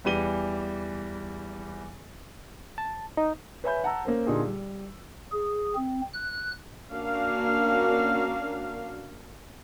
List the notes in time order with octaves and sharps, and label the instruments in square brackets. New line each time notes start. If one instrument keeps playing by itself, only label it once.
[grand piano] E2 E3 G3 D#7 G7
[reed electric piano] A5
D#4
[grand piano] B4 C#5 E5 G#5 B5 G6
F#5 A5 A#5 E6
A#3 C#4 A#4 C5
A#2 D3 D#4 F4 G4 G#4
G3
[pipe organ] G#4
C4
F#6
[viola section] A#3 C#4 D4 F#4 A#4 F5